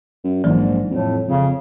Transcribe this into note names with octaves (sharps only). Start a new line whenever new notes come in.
F#2
A#1 G#2 E3 F#3 G#3
F2 A2
F2 C#3